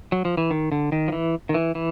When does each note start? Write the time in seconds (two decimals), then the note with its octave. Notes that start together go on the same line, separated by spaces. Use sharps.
0.12 F#3
0.25 F3
0.37 E3
0.51 D#3
0.72 D3
0.92 D#3
1.08 F3
1.12 E3
1.49 D#3
1.54 E3
1.75 E3